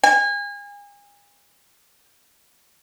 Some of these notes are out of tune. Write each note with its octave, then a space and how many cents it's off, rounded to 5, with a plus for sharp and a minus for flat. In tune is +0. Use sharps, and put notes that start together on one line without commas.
G#5 -35